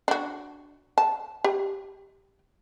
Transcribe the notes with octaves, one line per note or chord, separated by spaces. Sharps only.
D4 F#4
A5
G4